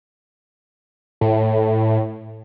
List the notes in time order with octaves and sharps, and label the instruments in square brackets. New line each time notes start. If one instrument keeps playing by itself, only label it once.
[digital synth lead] A2